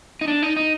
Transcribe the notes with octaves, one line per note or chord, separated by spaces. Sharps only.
D#4
D4
D#4
D#4